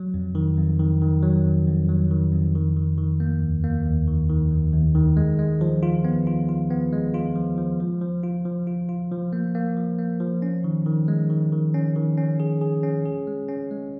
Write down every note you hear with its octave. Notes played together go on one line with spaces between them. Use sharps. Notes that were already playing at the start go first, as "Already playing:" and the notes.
Already playing: F#3
F2
D#3
F2
D#3
D#3
F#3
F2
F2
F#3
D#3
F2
D#3
D#3
D#3
A#3
D#2
A#3
D#2
D#3
D#3
D#2
D#2
D#3
G#3
G#3
F3
F4
B3
F4
F4
B3
G#3
F4
F3
F3
F3
F3
F4
F3
F4
F4
F3
A#3
A#3
F3
A#3
F3
C#4
D#3
D#3
G#3
D#3
D#3
C#4
D#3
C#4
G#4
G#4
C#4
G#4
G#3
C#4
G#3